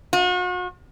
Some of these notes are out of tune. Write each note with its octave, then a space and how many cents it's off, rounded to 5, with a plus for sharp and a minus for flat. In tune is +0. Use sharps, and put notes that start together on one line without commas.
F#4 -40